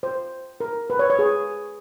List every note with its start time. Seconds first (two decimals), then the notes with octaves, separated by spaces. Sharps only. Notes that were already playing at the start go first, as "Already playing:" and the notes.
0.03 C5
0.60 A#4
0.90 B4
0.99 C#5
1.10 C#5
1.19 G#4